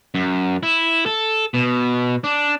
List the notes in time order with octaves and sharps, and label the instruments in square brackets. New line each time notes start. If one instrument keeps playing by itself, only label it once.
[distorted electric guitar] F#2
E4
A4
B2
D4